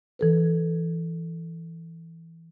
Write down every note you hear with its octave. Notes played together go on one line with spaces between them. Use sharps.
E3 A4 B4